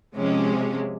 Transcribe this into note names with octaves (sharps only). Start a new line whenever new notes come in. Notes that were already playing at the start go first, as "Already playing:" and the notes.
C3 F3 G#3 C#4